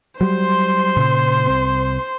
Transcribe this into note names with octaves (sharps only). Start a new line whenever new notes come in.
F#3 G3 C5 C6
A#2 C#3
C2 C4